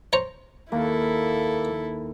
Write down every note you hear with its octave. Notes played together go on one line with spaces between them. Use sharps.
C5 C#5 A#5
D#2 A#3 E4 A4